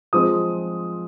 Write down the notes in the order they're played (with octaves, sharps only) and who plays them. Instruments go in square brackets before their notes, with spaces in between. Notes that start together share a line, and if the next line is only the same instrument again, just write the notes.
[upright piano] F3 G#3 C4 D#6